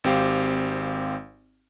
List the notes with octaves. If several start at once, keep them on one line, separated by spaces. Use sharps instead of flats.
G#1 C4 G4 F5 D6